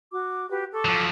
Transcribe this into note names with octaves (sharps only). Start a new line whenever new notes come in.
F#4 D6
F#4 G4 B4
A4 C#6 D6
F3 F#3